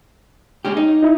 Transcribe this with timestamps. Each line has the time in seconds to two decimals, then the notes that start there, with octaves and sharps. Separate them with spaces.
0.65 G#3 C#4 G4
0.77 D#4
1.03 D#4 E4